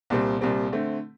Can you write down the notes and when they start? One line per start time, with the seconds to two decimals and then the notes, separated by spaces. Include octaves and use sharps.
0.10 C2 A#2 G3 C4
0.41 C2 A#2 G3 C4
0.72 D3 A3 C4